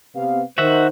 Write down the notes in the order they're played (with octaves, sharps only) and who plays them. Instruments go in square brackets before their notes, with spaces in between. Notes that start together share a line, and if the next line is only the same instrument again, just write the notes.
[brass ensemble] C3 B3 F5
[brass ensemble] D#3 [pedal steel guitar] F#4 E5 F#5 [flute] C5